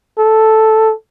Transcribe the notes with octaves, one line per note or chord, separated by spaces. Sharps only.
A4